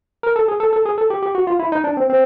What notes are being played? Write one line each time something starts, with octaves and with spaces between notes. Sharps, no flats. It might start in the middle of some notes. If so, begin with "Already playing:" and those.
A#4
A4
G#4
A4
A4
G#4
A4
G4
G4
F#4
F4
E4
D#4
D4
C4
C4